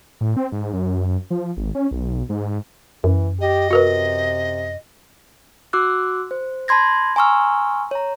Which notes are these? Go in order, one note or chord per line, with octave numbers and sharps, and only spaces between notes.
A2
C4
G#2
F#2
F3
G#1
C#4
B1
G#2
F#2 E3
G4 D#5
C3 F#4 A#4 B4
F#4 D6 E6 F#6
C5
A5 B5 C6 G#6 A#6
G#5 A#5 C6 C#6 E6 F6
C#5 A#5